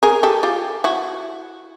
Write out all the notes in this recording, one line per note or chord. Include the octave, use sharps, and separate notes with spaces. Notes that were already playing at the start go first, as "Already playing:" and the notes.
G#4 A#4
G4 A4
F4 G4
E4 F#4